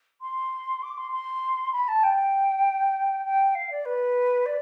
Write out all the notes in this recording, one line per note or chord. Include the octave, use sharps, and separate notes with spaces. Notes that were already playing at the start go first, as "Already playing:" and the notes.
C6
D6
C6
C6
B5
A5
G5
G5
F5
D5
B4
D5